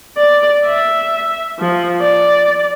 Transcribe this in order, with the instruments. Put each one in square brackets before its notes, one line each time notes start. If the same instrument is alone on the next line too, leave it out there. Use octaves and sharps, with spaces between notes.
[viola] D5
E5
F3
D5